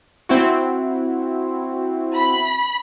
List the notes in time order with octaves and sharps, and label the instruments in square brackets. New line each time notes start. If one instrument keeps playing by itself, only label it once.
[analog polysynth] C4 E4 F#4
[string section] B5